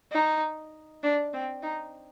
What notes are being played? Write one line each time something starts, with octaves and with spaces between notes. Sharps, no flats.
D#4
D4
C4
D#4